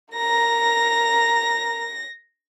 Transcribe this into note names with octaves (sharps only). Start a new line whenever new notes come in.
A#4 A#5 A#6